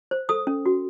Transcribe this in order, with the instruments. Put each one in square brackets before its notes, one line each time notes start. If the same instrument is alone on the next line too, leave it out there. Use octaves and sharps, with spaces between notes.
[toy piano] C5
A4 D#6
C#4
F#4